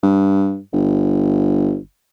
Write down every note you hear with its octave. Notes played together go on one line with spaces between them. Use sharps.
G2
G1